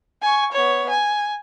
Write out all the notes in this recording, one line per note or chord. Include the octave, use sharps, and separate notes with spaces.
G#5 C#6
B3 C#5
G#5